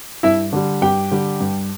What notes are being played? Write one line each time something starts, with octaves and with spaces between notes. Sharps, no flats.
G2 E4 E5
D3 G3
G2 G4 G5
D3 G3
G2